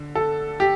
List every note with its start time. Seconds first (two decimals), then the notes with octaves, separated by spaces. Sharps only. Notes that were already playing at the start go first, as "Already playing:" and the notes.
Already playing: D3
0.15 A4
0.60 G4